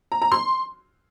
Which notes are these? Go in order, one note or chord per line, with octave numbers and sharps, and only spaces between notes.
A#5
A#5
C6